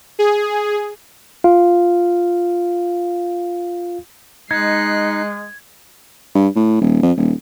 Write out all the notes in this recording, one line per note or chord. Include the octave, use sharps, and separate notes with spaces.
G#4
F4 F5
G#3 D#4 F#6 G#6 C7
G2
A2
D#1
F2
D#1